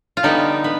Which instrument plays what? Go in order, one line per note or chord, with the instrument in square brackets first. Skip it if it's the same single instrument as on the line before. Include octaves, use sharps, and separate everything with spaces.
[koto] F4
D3 G3 B3 D#4
B3